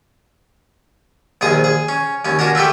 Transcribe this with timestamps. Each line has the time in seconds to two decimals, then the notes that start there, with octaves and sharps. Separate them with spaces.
1.41 A#1 D#2 G#4 D#6
1.64 G#4
1.89 C#4
2.25 D#2 C#4
2.39 C#4 D4 F#4 A#4
2.55 A3 E4 F4 G4